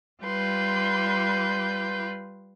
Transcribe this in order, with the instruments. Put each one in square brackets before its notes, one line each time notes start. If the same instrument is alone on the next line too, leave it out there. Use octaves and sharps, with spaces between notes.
[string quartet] G3 F4 B4 C6 G6